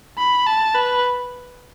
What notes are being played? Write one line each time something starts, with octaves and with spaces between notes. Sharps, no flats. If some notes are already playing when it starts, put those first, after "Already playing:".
B5
A5
B4